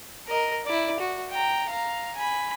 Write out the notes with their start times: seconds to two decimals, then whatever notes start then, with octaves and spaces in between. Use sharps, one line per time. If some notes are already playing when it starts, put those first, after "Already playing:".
0.28 A#4 D#5
0.65 E4 D5
1.00 F#4
1.31 G5 A#5
1.69 F5 A#5
2.16 G#5 B5